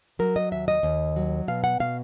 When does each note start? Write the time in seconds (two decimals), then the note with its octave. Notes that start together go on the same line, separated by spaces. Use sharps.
0.19 F#3 A#4
0.36 D#5
0.52 D#2 E5
0.68 D#5
0.83 D#2
1.16 F#3
1.48 B2 F5
1.64 F#5
1.80 B2 F5